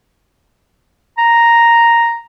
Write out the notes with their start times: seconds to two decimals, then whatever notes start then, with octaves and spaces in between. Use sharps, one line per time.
1.18 A#5